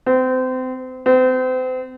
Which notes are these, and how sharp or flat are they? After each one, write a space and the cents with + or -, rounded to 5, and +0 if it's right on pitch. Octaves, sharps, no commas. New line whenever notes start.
C4 -30
C4 -35